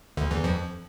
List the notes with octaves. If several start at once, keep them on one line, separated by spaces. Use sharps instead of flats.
D2 D3
E2 E3
F2 F3